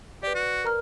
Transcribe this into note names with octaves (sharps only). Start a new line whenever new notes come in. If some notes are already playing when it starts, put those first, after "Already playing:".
G4 B4 D5
F#4
A#4 A#5 F6